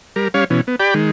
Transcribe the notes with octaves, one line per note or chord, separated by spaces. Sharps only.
G3 A#4
G3 C#4 C#5 F5
B2 E3 C#4
B3
G4 D5 G5 B5
D#3 G#3